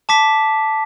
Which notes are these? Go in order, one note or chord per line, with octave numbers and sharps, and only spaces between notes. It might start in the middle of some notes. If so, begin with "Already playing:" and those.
A5 D6 B6